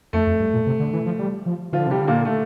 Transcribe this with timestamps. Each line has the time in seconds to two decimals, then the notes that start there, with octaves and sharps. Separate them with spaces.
0.13 F2 A3
0.27 F2
0.40 G2
0.54 A#2
0.67 C3
0.79 D3
0.93 E3
1.06 F3
1.19 G3
1.46 F3
1.72 D3 F3 F4
1.87 C3 G3 G4
2.01 D3
2.07 A#2 A#3
2.25 A3